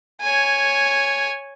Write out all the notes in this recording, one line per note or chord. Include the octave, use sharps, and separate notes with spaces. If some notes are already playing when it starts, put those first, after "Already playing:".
C#5 G#5